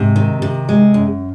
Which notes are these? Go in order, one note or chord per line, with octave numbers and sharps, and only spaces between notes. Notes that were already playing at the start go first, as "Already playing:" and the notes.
Already playing: G#2 C3
D#3
C3
G#3
F#2